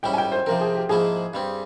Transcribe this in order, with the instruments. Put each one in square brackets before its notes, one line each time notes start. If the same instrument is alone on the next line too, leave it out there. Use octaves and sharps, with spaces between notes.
[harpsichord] G#2 G3 C#4 E4 [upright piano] G5
[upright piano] G#5
G5
C5
[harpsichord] C3 F3 C4 [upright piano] A#4
[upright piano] G#4
G4
[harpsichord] G#2 F3 A#3 E4 [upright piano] G#4
[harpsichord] G2 G3 C4